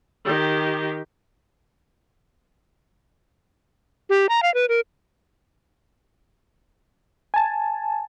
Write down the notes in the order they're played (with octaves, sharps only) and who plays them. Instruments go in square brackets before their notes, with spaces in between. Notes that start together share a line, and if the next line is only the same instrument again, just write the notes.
[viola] D#3 G4
[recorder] G4
A#5
F5
B4
A#4
[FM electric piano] G#5 A5